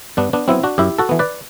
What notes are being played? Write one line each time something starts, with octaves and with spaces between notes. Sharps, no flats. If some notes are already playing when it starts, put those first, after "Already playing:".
G2 B3 D4
B3 D4
F#3 B3 C4 E4
D4 F#4
F#2 E4 G4
F#4 A4
E3 B3
B4 D5